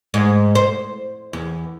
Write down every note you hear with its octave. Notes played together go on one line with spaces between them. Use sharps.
G#2
C5
E2